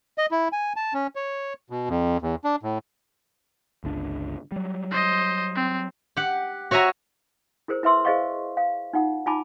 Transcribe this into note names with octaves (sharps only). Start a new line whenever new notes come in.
D#5
E4
G#5
A5
C#4
C#5
B2
F2
E2
D4
A2
G1 C#2 D4
F#3 G3
C5 D#5
C4
G4 F#5
F#4 C#5 E5 G#5 A#5
E4 G#4 A#4 C5
E4 B4 E5 C6 E6
G#4 C5 D#5 F5 C#6
F5
D#4 F4 F#5
D#4 F4 G#5 A5 B5 D6